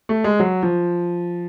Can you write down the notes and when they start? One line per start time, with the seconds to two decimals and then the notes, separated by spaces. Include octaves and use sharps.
0.09 A3
0.24 G#3
0.40 F#3
0.63 F3